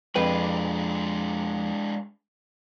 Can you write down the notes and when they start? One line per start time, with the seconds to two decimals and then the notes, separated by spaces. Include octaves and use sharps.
0.15 F2 G#3 D4 B4 G5